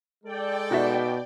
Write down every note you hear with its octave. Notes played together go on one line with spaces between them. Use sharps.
G#3 A4 D5 G5
B2 D#4 F#4 E5